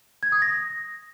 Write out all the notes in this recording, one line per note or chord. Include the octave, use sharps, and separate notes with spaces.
G#6
D#6
A#6